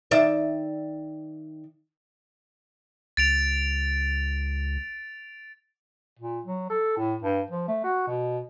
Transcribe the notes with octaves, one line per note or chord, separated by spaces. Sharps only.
D#3 D5 E5
C#2 A6 D7 F7
A#2
F#3
A4
A2
G2
F3
A3
F#4
B2